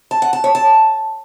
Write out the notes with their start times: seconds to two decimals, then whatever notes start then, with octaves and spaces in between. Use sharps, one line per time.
0.11 A5
0.22 F#5
0.33 A5
0.44 C#5
0.55 A5